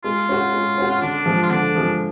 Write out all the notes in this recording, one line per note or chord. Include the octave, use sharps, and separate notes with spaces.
G#3 F4
C#4 F#4
G#3
C#4 F#4
F4
D3 D4
F3 G#3
F4
D3 D4
F3 G#3